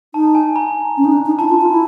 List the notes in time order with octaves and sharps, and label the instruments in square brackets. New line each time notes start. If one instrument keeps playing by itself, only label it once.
[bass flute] D#4 [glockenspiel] A5
[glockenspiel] G#5
A#5
[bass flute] C#4
D#4
D4
D#4
[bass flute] E4 [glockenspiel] A5
[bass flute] F4
F4
E4